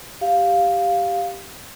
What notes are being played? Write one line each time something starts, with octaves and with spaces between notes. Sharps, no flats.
G4 F5